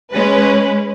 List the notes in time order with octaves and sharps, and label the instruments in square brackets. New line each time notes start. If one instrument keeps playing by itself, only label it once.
[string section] G#3 C#4 B4